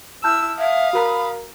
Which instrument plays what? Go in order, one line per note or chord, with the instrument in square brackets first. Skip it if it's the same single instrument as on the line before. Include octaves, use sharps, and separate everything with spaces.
[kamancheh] E4 E6 [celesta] A5 F6 G6
[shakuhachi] E5 [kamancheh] F5 D#6
[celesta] F#4 A#4 A#5 [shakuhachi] B5